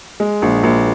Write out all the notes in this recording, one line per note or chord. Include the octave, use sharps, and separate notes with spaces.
G#3
A#1
A#1